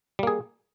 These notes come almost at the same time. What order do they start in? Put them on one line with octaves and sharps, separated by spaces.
G3 A#3 G#4